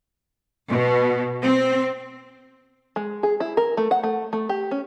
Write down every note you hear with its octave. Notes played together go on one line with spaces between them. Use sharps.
B2
C4
G#3
G#4
E4
A#4
A3
F#5
A3
A3
G4
C#4